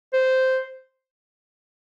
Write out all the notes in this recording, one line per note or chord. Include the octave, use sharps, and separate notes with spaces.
C5